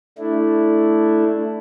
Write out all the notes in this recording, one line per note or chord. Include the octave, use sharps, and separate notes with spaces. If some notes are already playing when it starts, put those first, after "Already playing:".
A3 D4 E4